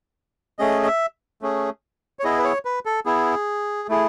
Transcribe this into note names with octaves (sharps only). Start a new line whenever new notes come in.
A3 C#4 G#4 D#5
D#5
E5
A3 C#4 G#4
C#5
B3 E4 G#4 D#5
B4
C#5
B4
A4
B3 E4 G#4
A3 E4 G#4